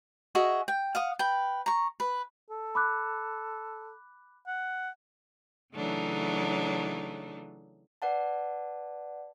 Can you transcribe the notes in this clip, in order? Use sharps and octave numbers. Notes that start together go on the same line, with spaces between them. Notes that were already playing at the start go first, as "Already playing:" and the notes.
F#4 G#4 D#5 E5
G5
F5 F#5 D#6
B4 G5
A#5 C#6
B4
A4
B5 D6 F#6
F#5
C#3 E3 F#3 A3 D4 D#4
B4 D5 F#5 A5